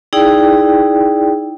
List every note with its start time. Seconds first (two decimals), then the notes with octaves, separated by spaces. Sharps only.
0.13 D#4 E4 G#4 D5 G5